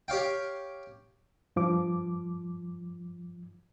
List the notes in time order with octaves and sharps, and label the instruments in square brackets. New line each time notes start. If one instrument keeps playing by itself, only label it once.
[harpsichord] G4 C#5 F5 G5
[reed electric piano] G2 F3 D6